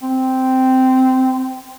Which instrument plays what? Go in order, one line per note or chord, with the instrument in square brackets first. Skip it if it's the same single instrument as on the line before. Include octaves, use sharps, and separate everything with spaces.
[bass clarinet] C4